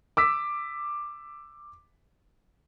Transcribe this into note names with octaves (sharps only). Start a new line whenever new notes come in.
D6 E6 B6